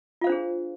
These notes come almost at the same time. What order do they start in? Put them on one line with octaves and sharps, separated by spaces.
F4 F5 C5 D4 G#4